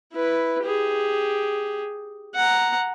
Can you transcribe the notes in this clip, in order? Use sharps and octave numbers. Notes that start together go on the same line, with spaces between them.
E4 B4
G4 G#4
F#5 A#5